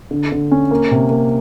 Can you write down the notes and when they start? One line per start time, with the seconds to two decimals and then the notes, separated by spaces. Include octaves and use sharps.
0.11 D3
0.32 D3
0.51 C#4
0.71 A#3
0.91 C3
1.10 A#3